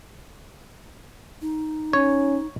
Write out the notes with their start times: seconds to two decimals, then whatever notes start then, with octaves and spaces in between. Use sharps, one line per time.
1.42 D#4
1.93 C#4 C#5